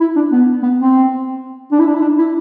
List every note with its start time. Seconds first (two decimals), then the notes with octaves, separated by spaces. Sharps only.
0.01 E4
0.16 D4
0.32 B3
0.63 B3
0.78 C4
1.72 D4
1.79 E4
1.86 D4
1.94 E4
2.01 D4
2.19 E4